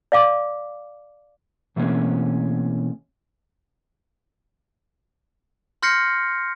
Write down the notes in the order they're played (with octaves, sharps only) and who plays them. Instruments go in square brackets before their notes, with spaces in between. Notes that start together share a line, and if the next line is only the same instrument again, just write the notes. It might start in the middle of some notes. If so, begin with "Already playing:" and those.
[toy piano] D5 F5 D6
[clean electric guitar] B2 E3 A3 A#3 C4 C#4
[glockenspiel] C6 F6 G6 A#6 C7 C#7